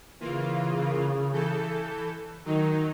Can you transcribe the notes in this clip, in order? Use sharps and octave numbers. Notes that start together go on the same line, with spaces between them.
C#3 E3 A#3 F4
E3 A4 G6
D#3 F#3 D#4